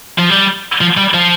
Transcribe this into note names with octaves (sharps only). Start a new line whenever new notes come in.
F3
G3
F3
G3
F3